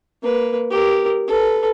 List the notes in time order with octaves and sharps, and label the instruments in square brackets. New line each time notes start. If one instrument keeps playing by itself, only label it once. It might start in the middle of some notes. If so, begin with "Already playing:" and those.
[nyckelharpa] A#3 B4
G4 A#4
A4 B4